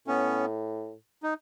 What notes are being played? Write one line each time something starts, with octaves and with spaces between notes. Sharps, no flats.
A2 B3 C#4
D#4